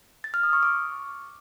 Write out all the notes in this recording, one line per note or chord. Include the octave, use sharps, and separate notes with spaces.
A6
F6
D#6
C#6
D6